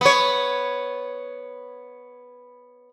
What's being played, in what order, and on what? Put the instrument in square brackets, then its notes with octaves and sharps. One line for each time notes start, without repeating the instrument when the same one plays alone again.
[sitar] B3 C#5